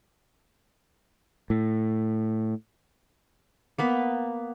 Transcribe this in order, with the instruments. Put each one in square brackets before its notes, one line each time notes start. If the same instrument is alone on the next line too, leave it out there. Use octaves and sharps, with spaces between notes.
[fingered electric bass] A2
[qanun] A#3 B3 B4